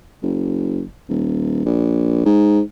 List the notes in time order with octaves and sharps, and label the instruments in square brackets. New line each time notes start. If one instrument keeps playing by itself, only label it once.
[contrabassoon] F#1
D#1
A#1
G#2